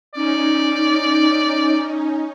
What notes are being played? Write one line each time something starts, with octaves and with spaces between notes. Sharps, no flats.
C#4 D#4 D5